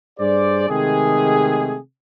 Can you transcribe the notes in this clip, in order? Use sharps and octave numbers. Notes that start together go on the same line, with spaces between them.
G2 G#4 C5 D5
C3 D#3 G#3 A3 G4 G#4